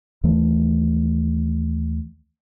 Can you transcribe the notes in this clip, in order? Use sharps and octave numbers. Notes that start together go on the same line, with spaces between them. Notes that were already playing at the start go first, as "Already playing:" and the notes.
D#2 E3 A3